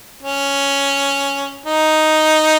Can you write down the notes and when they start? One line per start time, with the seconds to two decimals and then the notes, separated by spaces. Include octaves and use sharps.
0.23 C#4
1.66 D#4